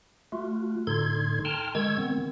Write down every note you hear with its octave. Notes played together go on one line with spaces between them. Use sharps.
A3 F4 F#4
A2 D3 D#4 A4 C6 G#6
G5 A5 A#5 C6 F6
D#3 G#3 C#6 E6 G#6
D#3 B3 C4